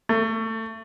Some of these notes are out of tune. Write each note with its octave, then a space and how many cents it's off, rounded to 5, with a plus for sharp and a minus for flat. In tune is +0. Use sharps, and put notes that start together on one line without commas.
A3 +25